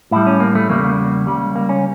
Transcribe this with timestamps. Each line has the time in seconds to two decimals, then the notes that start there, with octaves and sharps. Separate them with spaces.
0.11 A2 G3 E4
0.27 C#4
0.40 A#3
0.55 A3
0.69 E2 C#3 E3 G3 A#3
0.84 A#3
1.27 C#2 C#3 G3
1.56 A#3
1.69 C#4